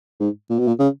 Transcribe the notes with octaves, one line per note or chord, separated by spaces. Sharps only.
G#2
A#2
B2
A#2
C#3